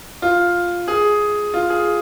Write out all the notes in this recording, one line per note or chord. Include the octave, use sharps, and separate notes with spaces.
F4
G#4
F4
G#4